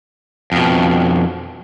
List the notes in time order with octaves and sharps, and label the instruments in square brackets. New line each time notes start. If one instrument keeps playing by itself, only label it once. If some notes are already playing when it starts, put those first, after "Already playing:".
[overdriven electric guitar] F2 B2